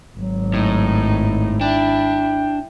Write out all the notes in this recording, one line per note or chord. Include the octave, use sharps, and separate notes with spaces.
G#1 F#3
A2 D#4
D4 E4 G5